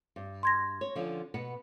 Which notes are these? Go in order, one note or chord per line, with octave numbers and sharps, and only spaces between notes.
G2
C6 G#6 A#6
C#5
D3 F3 C#4
B2 B3 F#5